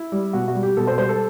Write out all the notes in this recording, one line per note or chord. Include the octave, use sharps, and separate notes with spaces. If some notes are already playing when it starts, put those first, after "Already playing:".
Already playing: E4
G3
B2 F#4
F#4
G3
G4
B2 A4
C5
G3 C5
A4